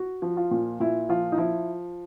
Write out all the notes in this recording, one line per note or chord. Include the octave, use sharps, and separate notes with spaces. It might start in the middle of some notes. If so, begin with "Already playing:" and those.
Already playing: F#4
F3
F4
A#2
A#2 E4
F3 F4
D#4
F3 E4